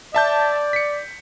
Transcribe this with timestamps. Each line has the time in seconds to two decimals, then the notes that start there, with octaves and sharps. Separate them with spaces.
0.15 D5 E5 A5 G6
0.73 B6 C#7